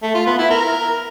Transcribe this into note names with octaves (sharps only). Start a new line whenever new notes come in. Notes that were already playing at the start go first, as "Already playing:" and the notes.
A3
F4
B3
E4
A#4